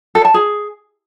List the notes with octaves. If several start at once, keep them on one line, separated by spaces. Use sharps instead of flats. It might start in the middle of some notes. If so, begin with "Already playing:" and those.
A4
A5
G#4